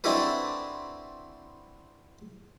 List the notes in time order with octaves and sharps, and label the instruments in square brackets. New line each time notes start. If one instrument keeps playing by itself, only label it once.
[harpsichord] C4 D4 E4 F#4 A4 B4